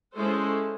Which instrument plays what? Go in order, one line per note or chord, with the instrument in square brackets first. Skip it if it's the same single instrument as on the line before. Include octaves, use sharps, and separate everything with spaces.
[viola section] G#3 C#4 E4 A4 C5